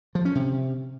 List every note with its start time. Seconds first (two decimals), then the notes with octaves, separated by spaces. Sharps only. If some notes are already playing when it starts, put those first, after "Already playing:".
0.15 F3
0.25 C#4
0.35 C3